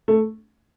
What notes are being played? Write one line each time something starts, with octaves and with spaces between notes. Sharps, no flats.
A3